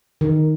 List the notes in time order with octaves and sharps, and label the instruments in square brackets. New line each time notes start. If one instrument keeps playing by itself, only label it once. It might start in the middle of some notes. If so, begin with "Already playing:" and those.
[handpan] D#3